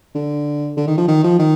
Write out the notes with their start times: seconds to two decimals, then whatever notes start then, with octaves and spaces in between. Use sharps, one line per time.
0.15 D3
0.77 D3
0.87 D#3
0.97 F3
1.08 D#3
1.24 F3
1.39 D#3